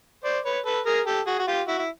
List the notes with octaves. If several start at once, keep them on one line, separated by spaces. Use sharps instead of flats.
C5 D5
B4 C#5
A4 B4
G#4 A#4
G4 A4
F#4 G#4
F#4
F4 G4
E4 F#4
E4